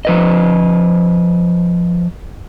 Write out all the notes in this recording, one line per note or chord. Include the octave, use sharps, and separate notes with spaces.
F3 B4 D#5